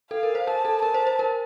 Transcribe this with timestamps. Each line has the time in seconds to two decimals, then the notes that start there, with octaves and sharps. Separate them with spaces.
0.11 A4 F5
0.23 A#4
0.35 C5
0.47 A#4 A5
0.65 A4
0.82 A#4 A5
0.94 C5
1.07 C5
1.19 A#4